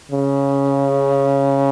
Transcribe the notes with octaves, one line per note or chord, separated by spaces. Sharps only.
C#3